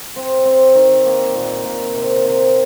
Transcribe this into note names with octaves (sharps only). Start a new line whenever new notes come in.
C4
C4
D#3
A#3
A#2
A#2
C3
C3